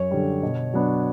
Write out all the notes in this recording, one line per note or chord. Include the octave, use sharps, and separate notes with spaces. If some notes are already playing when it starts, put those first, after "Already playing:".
Already playing: F#2 C#5
D3 G3
B2
F#3 B3 D4